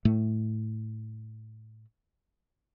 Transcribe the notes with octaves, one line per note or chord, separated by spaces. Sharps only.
A2 A3